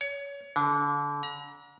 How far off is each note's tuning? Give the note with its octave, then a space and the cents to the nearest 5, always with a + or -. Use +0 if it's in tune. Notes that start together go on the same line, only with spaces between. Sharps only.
C#5 +25
D3 -30
A#5 +35